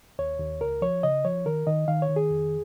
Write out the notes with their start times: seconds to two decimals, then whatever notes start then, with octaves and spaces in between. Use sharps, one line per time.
0.19 D#2 C#5
0.40 D#2
0.61 C#2 A#4
0.82 F3 C#5
1.03 C#3 D#5
1.25 F3 C#5
1.46 D#3 A#4
1.67 D#3 D#5
1.88 D#3 F5
2.02 C#5
2.10 D#3
2.16 G#4
2.30 F2